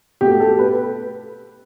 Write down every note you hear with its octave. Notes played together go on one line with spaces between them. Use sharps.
B2 A3 G4
A4
B4